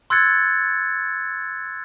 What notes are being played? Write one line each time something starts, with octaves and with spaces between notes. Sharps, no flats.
C6 E6 F#6 G#6 A6 C#7